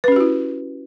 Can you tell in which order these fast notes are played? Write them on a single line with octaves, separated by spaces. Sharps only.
B4 C#4 G4 F#4 E4